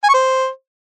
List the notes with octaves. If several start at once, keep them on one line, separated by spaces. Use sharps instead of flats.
G#5
C#6
C5